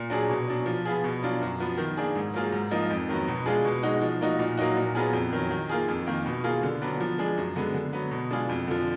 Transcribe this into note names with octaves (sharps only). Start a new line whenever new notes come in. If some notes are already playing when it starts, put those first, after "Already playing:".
Already playing: A#2
F#3 D4 G#4
B2
F#3 D4
F3
B3 F4 G#4
B2
F#3 D4 F4
F#2
F3 B3
D#3
A#3 D4 G#4
G#2
F#3 A#3 F4 G#4
G#2
F3 A#3 D#4
F2
D#3 F#3 B3
B2
G#3 D4 F4 G#4
B2
G#3 D#4 F#4
F3
A#3 D#4 F#4
A#2
F#3 A#3 D#4 F#4
A#2
F#3 B3 F4 G#4
F2
D#3 F#3
D#3
A#3 F4 G#4
F2
D#3 A#3
B2
A#3 F4 G#4
D3
F#3 B3 D4
F3
G#3 D4 G#4
F#2
D3 G#3 B3
D3
F#3 B3
B2
G#3 D4 F4 G#4
F2
D3 F3